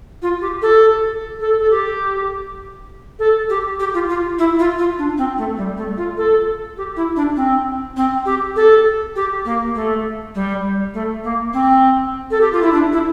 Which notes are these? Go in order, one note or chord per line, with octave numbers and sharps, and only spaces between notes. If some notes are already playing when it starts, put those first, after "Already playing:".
F4
G4
A4
A4
A4
G4
A4
G4
G4
F4
F4
E4
F4
F4
D4
C4
A3
G3
A3
F4
A4
G4
E4
D4
C4
C4
G4
A4
G4
A#3
A3
G3
A3
A#3
C4
A4
G4
F4
E4
D4
E4